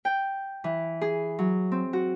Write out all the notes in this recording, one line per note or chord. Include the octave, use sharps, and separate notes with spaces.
G5
E3
G#4
F#3
C4
F#4